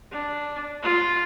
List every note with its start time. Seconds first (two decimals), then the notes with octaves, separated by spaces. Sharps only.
0.11 D4
0.83 F4